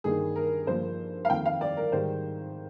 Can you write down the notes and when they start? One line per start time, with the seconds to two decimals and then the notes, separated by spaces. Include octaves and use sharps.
0.04 G2 D#3 A#3 D#4 G#4
0.36 A#4
0.67 G2 F3 A#3 C5
1.25 F5
1.30 F2 D#3 A#3 G5
1.46 F5
1.61 D5
1.77 A#4
1.92 G#2 D#3 G3 C5